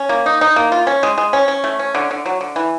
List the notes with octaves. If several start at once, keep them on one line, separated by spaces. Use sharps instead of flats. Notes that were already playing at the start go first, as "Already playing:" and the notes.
Already playing: C#4
A#3
D#4
D#4
A#3
F4
C#4
G#3
G#3
C#4
C#4
A3
C#4
D3
D3
F#3
D3
E3